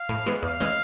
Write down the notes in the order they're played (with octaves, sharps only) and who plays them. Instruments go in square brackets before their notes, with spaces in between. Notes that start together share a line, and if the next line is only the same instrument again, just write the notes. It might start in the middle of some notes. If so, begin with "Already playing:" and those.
Already playing: [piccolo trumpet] F5
[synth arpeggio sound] A2
E3 G#3 B3
[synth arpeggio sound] E2 [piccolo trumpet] F5
[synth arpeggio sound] C#3 E3 G#3